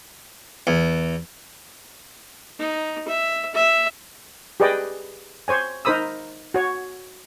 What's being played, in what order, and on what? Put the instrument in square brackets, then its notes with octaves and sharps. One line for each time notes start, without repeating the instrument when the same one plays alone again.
[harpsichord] E2
[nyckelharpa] D#4
E5
E5
[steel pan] G4 G#4 B4 D5 D#5 G5
C5 C#5 G#5
D#4 A#4 C5 B5 D#6 E6
F#4 C#5